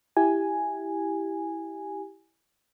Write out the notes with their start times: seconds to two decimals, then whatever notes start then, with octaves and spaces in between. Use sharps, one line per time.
0.17 E4 G4 G#5